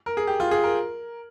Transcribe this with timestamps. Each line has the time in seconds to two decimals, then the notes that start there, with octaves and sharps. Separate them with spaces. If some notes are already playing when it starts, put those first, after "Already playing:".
0.06 A#4
0.17 G#4
0.27 G4
0.40 F4
0.51 G#4
0.63 A#4